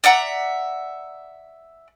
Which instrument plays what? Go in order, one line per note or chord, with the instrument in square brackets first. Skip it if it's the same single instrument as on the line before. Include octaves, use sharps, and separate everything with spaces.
[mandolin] D5 E5 F#5 A#5